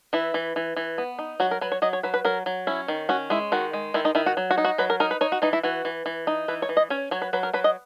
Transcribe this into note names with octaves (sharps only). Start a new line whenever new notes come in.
E3 E4
E3
E3
E3
B3
D#4
F#3 F#4
A#4
F#3 B4
C#5
F#3 D#5
C#5
F#3 B4
B4
F#3 A#4
F#3
C#4 E4
D#3
C#4 F#4
G#3 E4
D#3 F#4
G#3
D#3 E4
D#4
D#3 E4
F#4
F#3
F#4
D#4
F#4
F#3 B4
A#4
D#4 A#4
B4
D#4 C#5
F#4
E3 D#4
E4
E3 F#4
E3
E3
D#4
E3 B4
C#5
E3
D#5
C#4 C#5
F#3 C#5
B4
F#3 B4
A#4
F#3 B4
D#5